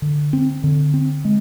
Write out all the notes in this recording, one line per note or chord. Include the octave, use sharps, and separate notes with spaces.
D3
C4
D3
C4
G#3